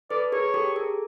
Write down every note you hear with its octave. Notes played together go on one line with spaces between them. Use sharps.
A4 B4 D5
G#4 A#4 C#5
G4 A4
G#4 A#4